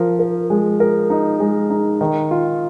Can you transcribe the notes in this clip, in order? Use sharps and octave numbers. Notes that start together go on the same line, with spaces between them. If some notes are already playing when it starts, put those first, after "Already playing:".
Already playing: F3 A#4
A#4
G#3
A#4
D#4
G#3
D#4
D#3
F4